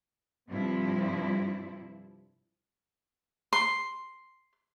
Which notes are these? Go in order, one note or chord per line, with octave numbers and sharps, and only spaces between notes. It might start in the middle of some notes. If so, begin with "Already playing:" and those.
G2 C3 F3 C4 E4
C6